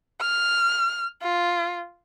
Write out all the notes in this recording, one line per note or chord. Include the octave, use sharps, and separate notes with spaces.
F6
F4